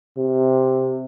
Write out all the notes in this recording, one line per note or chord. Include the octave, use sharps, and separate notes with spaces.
C3